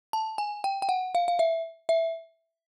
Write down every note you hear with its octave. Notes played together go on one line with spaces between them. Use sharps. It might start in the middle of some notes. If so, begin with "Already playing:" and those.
A5
G#5
G5
G5
F#5
F5
F5
E5
E5